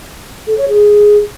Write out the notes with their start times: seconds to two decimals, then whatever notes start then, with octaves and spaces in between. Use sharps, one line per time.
0.47 A4
0.58 C#5
0.68 G#4